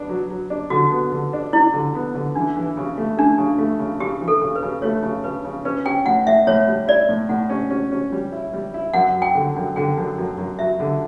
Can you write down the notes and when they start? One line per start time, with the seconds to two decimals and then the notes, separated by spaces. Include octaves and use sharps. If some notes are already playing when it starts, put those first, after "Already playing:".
Already playing: B3 D4
0.09 F#3
0.30 F#3
0.50 D4
0.70 D3 F#4
0.91 B3
1.12 D3
1.33 D4
1.53 D4 E4
1.74 D3
1.95 B3
2.15 D3
2.35 E3 D4
2.57 E3
2.77 C#3
2.98 A3
3.17 A3 D4
3.38 C#3
3.58 A3
3.79 C#3
4.00 C#3 G4
4.21 E3
4.28 A4
4.42 C#3
4.55 B4
4.63 C#3
4.82 A3 C#5
5.03 C#3
5.24 C#3 B4
5.45 C#3
5.65 C#4 B4
5.85 C#4 G5
6.06 A2 F#5
6.26 A2 E5
6.47 A2 C#5
6.67 G3
6.88 E4 D5
7.09 A2
7.29 A2 F#5
7.50 C#4
7.71 C#4
7.92 C#4
8.12 G3
8.32 E4
8.54 G3
8.74 E4
8.94 F#2 F#5
9.15 F#3
9.22 G5
9.35 D3
9.56 F#2
9.76 D3 G5
9.97 F#2
10.18 F#2
10.38 F#2
10.59 F#3 E5
10.80 D3